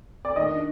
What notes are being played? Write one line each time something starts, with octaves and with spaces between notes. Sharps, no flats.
D5
D#3 D#5
D4